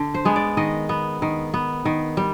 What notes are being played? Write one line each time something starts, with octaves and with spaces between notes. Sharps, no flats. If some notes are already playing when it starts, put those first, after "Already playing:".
Already playing: D3
C5
G#3 B3
D5
D#3 D#5
B3
D#3
B3
D#3
G3